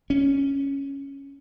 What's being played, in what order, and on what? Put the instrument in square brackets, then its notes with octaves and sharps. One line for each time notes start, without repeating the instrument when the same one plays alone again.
[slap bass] C#4